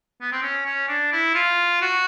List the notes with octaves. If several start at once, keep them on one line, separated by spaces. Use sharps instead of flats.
B3
C4
C#4
C#4
D4
E4
F4
F#4